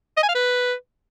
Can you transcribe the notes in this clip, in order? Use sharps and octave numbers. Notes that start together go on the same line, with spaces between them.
D#5
G#5
F5
B4